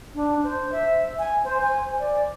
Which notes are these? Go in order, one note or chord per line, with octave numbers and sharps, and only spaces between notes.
D4
C5
E5
G#5
C5
G#5
D5